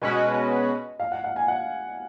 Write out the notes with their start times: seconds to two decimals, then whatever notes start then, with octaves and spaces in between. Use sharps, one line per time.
0.02 B2 G#3 C#4 F#4 B4 D#5
1.00 F5
1.12 F#5
1.24 F#5
1.36 G#5
1.48 F#5